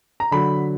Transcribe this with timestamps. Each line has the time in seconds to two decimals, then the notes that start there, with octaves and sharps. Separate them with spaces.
0.20 A#5
0.31 D3 F#3 B5